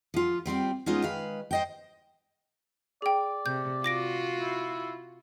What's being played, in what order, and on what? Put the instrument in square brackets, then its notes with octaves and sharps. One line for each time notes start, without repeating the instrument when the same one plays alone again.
[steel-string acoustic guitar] F3 F4
G3 C4 F4 D5
G#3 B3 C#4 D#4 F4
D#3 G#3 B4 F5
C5 D#5 G5
[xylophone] G#4 G5 [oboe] D5
[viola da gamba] C3 [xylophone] G6
[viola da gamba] F4 F#4 [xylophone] D6 A#6 D7
[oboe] E4